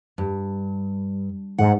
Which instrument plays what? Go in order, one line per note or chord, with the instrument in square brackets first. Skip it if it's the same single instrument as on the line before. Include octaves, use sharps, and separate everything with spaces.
[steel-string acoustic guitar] G2
[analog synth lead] G#2 [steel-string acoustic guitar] F#5